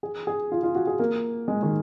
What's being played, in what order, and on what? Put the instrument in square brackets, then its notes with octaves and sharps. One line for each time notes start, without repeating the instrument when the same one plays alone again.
[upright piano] G#4
G#4
F4
F4
F#4
G#4
A#3
G#3
D#3